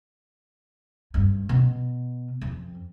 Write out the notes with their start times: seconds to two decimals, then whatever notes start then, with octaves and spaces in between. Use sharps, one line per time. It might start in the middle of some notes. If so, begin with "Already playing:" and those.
1.14 G2
1.49 B2
2.41 F2